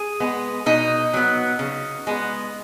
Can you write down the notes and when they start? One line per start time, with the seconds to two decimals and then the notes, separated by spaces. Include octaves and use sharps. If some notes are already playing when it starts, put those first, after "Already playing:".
Already playing: G#4
0.20 G#3 B3
0.66 B2 D#4
1.14 F#3 B3
1.59 C#3
2.07 G#3 B3